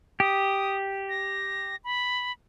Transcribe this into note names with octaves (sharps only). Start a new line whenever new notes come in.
G4 D#6
A#6
B5